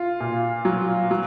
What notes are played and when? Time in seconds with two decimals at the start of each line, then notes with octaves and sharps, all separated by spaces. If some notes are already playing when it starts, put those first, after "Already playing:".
Already playing: F4
0.20 A#2
0.65 F#3
1.11 F#3